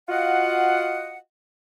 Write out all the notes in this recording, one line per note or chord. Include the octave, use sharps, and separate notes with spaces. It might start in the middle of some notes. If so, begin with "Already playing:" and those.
F4 F#4 D#5 F5 F#5